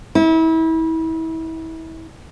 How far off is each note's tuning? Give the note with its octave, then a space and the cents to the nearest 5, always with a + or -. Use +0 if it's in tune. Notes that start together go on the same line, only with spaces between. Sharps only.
E4 -30